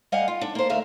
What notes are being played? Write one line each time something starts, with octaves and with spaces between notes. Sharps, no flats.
G3 D#5 F5 F#5 G#5
F4
D4
A#3 C5
D2 A#4 E5 F5